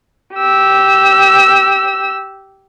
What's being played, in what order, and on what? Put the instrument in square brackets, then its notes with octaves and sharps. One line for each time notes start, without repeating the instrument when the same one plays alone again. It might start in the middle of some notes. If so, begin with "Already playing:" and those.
[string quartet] G4 E6